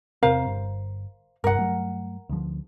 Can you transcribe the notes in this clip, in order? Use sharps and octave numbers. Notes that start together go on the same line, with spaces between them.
E2 C3 C4 A#4 C5 F5
G1
G1 C2 G2 A#4 F#5
G2 F#3 A3
D2 F3